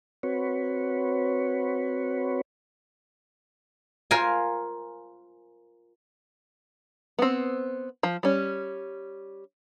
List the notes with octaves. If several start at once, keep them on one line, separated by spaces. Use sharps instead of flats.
C4 F#4 B4 C#5
F4 A#4 C5 G#5
B3 C4
F3
G3 C#4